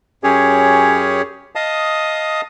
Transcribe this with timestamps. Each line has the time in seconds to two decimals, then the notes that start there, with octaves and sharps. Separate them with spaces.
0.23 F#2 C#4 G4 G#4 C#5
1.55 D#5 F5 A5 D#6